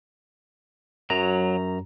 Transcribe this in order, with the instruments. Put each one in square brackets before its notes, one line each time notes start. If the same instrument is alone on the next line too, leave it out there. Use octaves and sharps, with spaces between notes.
[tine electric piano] F#2 A#5 [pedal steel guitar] F#3